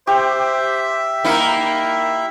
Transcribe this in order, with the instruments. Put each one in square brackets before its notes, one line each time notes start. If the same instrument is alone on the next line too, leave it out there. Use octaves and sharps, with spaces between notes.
[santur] G4 [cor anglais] C5 [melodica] E5
[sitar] A#3 D#4 E4 [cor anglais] A#4